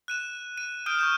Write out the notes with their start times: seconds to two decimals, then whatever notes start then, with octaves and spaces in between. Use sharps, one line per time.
0.08 F#6 D#7 E7
0.58 D#7
0.86 D#6 F6 G6 D7 D#7
0.99 C#6 G6 E7